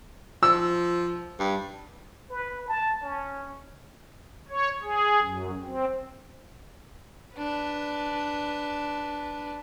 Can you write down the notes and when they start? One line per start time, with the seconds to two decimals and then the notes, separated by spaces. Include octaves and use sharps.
0.43 F3 E6
1.39 G2
2.30 B4
2.68 A5
3.03 C#4
4.49 C#5
4.82 G#4
5.22 F#2
5.63 C4
7.35 D4 B4